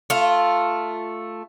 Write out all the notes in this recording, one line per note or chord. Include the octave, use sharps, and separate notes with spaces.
A3 F4